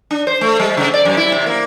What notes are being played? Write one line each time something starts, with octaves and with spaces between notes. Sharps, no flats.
D4
C5
A3
G3
C#3
D5
F#2
E4
C3
A#3